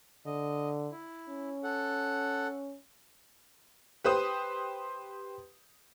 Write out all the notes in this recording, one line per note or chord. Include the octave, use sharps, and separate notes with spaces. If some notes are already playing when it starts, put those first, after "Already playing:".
D3 D#5
E4
C#4
A4 F#5
G4 B4 C5 D#6